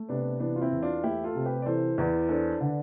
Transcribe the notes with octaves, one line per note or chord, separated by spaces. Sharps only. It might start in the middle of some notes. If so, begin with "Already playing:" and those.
Already playing: A3
C3 B3 D4
E3 B3 D4
F4
C4 E4
E2
D4 F4
A3 E4 G4
F4 A4
C3
G4 B4
D5
E3 A4 C5
E2 B4 D5
D4 A4 C5
D3 B4 D5